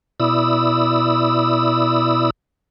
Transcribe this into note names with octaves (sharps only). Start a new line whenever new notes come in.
B2 E4 D5 B5 D#6 E6